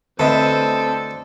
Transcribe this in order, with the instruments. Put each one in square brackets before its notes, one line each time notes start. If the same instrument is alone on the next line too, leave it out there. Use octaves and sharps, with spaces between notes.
[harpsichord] D2 D3 [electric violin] C4 [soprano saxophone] A4 [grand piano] B4 D#5 E5